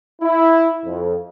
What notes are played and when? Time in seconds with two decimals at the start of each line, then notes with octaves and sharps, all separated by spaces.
0.22 E4
0.85 F2